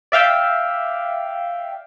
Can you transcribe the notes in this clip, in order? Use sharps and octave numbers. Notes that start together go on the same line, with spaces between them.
D5 E5 F5 G5